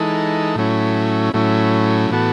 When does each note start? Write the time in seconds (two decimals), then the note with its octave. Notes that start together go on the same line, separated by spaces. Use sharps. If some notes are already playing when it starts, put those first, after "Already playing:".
Already playing: E3 G#3 D#4 A4
0.55 A2 F#3 A3 C#4 E4
1.34 A2 F#3 A3 C#4 E4
2.10 A2 E3 B3 F#4 A4